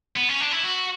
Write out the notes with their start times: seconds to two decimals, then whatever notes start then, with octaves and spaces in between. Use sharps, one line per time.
0.16 B3
0.29 C#4
0.40 D4
0.52 E4
0.63 F#4